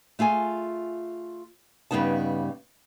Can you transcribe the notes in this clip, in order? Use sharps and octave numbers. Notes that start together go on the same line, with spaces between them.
A3 F4 G#4 G#5
G2 C#3 G3 B3 D#4 A5